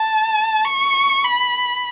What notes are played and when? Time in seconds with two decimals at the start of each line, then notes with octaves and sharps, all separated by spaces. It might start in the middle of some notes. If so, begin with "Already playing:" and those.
Already playing: A5
0.65 C#6
1.24 B5